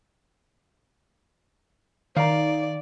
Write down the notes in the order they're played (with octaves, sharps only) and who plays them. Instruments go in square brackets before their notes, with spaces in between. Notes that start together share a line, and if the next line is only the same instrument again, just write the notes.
[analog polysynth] D#3 [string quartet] D5 [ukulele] F5 A#5